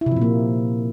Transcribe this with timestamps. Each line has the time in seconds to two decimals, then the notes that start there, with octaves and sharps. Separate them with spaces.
0.01 E4
0.06 C3
0.11 F3
0.16 A#2
0.22 A#3